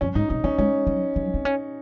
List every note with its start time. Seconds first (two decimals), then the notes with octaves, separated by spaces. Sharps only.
0.01 F2 C#4
0.15 G#2 D#4
0.29 C3 D#4
0.44 A#3 C#4
0.58 G#3 C#4
0.87 F#3
1.16 F#3
1.34 C4
1.45 C#4